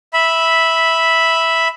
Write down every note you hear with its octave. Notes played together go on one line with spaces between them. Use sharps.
E5 B5